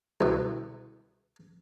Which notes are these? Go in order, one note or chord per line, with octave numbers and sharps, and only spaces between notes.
C2 B2